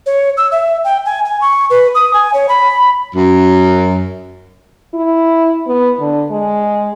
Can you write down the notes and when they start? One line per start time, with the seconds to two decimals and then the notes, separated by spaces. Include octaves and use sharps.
0.06 C#5
0.37 E6
0.52 E5
0.84 G5
1.06 G#5
1.25 G#5
1.41 C#6
1.70 B4
1.95 D#6
2.14 G#5
2.34 C#5
2.49 B5
3.15 F#2
4.94 E4
5.67 B3
6.00 D3
6.30 G#3